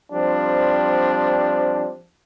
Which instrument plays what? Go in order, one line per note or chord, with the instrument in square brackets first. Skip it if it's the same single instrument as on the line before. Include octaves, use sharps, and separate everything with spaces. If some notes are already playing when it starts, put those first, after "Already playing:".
[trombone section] F3 G3 C4 D4